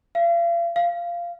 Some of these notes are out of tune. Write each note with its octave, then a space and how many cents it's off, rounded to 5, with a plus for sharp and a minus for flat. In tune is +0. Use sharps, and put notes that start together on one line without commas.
F5 -40
F5 -15